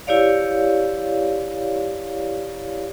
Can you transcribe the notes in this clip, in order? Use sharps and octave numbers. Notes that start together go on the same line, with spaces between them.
E4 G4 C#5 D5 F5